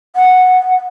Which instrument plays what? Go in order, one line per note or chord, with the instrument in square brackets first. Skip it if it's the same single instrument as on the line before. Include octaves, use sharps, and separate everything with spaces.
[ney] F#5